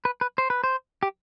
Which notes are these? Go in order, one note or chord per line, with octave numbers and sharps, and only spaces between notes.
B4
B4
C5
B4
C5
G4